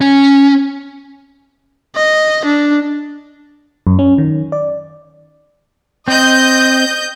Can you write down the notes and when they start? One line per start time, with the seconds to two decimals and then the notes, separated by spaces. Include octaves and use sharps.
0.01 C#4
1.96 D#5
2.45 D4
3.87 F#2
3.99 C#4
4.18 D#3
4.52 D5
6.08 C4 D#5 G6